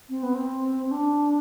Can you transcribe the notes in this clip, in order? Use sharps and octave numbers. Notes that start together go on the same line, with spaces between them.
C4
B3
C4
C4
D4